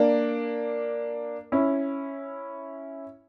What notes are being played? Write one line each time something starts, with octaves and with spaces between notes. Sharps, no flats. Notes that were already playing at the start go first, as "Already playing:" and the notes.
Already playing: A#3 D4
C#4 E4